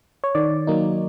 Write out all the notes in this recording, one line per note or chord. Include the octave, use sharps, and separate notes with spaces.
C#5
D#3 D5
F#3 A#3 D#4